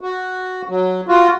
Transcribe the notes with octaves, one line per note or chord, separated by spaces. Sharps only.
F#4
F#3
F4 F#4